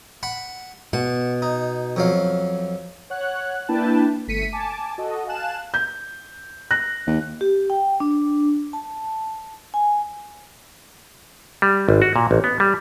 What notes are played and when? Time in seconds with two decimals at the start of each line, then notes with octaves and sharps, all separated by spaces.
0.23 F#5 B5
0.93 B2 F#5
1.42 D#4
1.96 F2 F#3 F5
3.10 C#5 F#5 F#6
3.69 A#3 D4 E4 B4 G5 A5
4.28 G1 A3 B6 C#7 D#7
4.53 G#5 A5 D6
4.98 F#4 A4 D#5
5.27 F5 G#5 A5 F#6 E7
5.74 G6
6.71 F#6 A#6
7.07 D#2
7.41 G4
7.70 G5
8.00 D4
8.73 A5
9.74 G#5
11.62 G3
11.89 G#1
12.02 F#4
12.16 A#2
12.31 A1
12.44 B3
12.60 G3